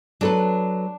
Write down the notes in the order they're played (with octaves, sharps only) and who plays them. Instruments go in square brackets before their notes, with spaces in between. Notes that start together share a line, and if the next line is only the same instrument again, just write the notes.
[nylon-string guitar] F#3 A4 B4 [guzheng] D4